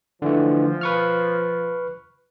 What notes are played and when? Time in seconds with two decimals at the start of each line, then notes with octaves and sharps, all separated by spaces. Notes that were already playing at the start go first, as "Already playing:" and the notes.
0.22 D3 E3 F3 A3
0.81 B4 C#6 F6